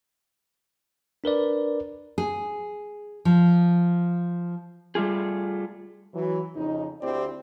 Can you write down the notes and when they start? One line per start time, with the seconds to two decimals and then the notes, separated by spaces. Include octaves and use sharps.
1.24 D4 A#4 B4 D5
2.18 G#4
3.25 F3
4.95 G3 A3 F4 G#4
6.15 E3 F#3
6.55 F2 C#3 D#4
7.02 D2 C4 E4 G4 D5